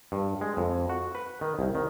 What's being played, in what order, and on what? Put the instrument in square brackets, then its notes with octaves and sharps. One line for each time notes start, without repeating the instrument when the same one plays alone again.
[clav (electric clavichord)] G2
G#3
F2
F#4
B4
D#3
C2
D#3